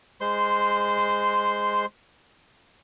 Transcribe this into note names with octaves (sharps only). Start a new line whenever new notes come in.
G#3 C5 C6